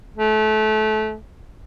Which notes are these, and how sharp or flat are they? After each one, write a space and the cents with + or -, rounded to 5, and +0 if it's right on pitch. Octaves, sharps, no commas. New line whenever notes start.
A3 -25